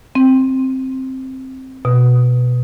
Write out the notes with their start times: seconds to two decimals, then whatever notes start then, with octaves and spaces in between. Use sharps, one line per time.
0.15 C4
1.85 B2